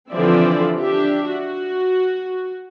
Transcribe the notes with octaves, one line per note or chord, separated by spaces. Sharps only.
D3 E3 F3 C4 D5 E5
D4 G4 E5
F#4